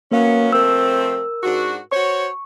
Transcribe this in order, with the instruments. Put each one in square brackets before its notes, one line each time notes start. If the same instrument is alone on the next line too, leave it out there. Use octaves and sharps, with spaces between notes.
[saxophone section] F#3 B3 C#4 [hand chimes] A#3 A#4 F5
[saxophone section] F3 A3 C4 [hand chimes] A#4 E6
[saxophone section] G#2 D4 F#4
[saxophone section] F#4 C5 C#5 [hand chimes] C#6